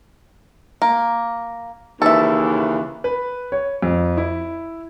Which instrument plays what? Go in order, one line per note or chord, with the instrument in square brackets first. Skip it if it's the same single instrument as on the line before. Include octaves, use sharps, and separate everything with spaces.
[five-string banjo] A#3
[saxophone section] D#2 C#3 E3 [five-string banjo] A4 E5
[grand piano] B4
C#5
F2
E4